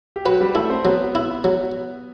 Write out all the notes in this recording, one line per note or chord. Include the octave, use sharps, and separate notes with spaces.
G4
F#3 F#4 B4
G3 G4
A3 E4 A4
C4 C5
F#3 B3 B4
E4
F#3